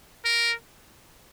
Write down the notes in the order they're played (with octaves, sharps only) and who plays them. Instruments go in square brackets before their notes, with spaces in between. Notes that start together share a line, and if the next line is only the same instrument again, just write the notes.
[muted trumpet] A#4